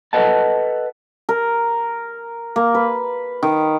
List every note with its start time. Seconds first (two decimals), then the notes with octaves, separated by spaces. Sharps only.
0.13 A4 B4 D#5 F#5 A5
1.29 A#4
2.56 A#3
2.74 B4
3.43 D#3